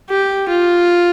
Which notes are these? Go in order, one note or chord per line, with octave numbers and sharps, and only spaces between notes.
G4
F4